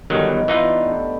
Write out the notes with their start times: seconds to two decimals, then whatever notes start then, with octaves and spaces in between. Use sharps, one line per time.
0.10 G1 D#3 F#3 D4 D#4 G4
0.23 B3
0.48 E3 D#4 F4
0.81 A3 G4